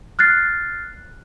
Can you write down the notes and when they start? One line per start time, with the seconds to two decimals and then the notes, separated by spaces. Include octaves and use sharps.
0.19 F6 F#6 A6 C7